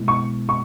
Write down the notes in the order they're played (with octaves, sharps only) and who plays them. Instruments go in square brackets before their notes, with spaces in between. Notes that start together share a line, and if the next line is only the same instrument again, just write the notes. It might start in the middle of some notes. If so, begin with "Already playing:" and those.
Already playing: [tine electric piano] B2 G#3 B3 E4
[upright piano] C#6
C#6